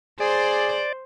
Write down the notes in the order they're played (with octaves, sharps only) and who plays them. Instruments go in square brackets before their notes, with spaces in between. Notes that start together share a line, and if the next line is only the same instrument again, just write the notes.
[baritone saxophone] G#4 [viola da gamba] C5 [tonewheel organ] D5